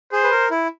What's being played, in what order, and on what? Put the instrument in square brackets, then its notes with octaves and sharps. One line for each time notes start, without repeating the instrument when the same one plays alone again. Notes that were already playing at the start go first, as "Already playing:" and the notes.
[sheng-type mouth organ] G#4 [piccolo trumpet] C5
[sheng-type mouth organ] B4
A#4
E4